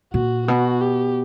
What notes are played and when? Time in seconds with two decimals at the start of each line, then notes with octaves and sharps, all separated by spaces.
0.13 A#2 F#4
0.47 B2 F#4
0.81 G4